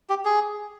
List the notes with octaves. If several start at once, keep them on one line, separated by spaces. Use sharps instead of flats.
G4
G#4